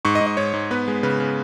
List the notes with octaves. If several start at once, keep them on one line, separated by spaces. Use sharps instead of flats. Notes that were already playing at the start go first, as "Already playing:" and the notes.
G#2 C#6
D#5
G#2
D#5
G#2 C#5
G#2
B3 B4
G#3
C#3 B4
C#3